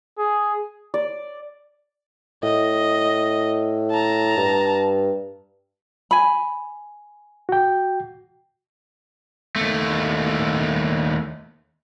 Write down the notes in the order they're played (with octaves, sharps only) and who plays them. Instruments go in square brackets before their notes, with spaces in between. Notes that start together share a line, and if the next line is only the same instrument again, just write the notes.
[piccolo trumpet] G#4
[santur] D5
[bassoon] A2 [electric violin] D#5
[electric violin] A5 A#5
[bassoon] G2
[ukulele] G#5 B5
[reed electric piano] F#4 G5
[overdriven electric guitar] D#2 A3